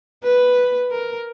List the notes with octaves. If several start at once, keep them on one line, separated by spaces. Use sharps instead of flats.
B4
A#4